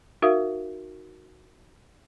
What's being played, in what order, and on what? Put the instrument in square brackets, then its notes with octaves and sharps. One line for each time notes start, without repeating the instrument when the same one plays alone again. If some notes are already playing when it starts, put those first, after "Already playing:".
[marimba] D#4 F#4 A#4 E5 F5 D#6